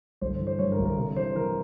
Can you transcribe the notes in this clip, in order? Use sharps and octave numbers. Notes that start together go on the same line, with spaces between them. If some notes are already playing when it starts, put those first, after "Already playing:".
G1 C5
E3
C5
G2 C#5
A#4
G1
A#4
C3 A#4
E3 C5
E3 A#4